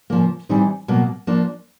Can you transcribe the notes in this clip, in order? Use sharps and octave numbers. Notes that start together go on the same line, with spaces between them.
C#3 F3 A#3
E3 G3 C4 D#4
B2 F#3 A#3
F3 A#3 D4